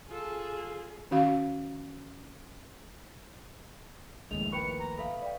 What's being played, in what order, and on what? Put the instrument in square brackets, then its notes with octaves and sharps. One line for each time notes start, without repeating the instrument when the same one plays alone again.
[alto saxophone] F4 [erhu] G#4 [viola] A4
[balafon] D#3 C#4 F#4 F5
[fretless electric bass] A#1 D#2 A2 [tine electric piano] G#3 [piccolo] F7
[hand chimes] A#4 G5 B5 [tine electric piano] B4 C#6 [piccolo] C#7
[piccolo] A#5
[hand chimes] A4 E5 F5 [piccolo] B5
[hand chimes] D5 G5